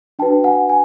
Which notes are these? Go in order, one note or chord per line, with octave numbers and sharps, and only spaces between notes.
D4 F#4 B4 G5 A5
F#5 G#5
G#5